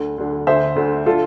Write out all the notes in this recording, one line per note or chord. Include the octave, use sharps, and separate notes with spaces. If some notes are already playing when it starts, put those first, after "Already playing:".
Already playing: D2 D3
D2 D3
D2 D3 C5 E5
D2 D3
D3 F4 A4